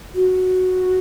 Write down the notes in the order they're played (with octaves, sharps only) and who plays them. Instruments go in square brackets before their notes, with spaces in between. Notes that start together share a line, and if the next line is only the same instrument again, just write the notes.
[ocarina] F#4